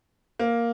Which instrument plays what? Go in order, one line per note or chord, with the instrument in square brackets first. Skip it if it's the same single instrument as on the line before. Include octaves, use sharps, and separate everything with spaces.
[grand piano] A#3